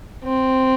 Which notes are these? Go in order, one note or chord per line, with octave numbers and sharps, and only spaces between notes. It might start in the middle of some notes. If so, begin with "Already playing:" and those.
C4